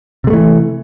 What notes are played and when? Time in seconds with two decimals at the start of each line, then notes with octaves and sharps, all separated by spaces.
0.24 C3
0.27 G#3
0.30 A3
0.33 E3